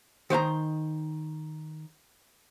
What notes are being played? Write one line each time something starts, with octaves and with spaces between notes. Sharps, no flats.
D#3 C5 F5 A#5